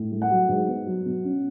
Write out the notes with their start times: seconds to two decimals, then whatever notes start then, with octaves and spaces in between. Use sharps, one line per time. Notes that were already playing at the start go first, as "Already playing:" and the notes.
Already playing: A2
0.12 A3
0.22 F#5
0.31 F#3
0.49 G#2
0.68 B3
0.87 F#3
1.06 B2
1.24 C#4